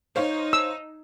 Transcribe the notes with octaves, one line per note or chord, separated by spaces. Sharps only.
D#4 C5 C#5 F5
E6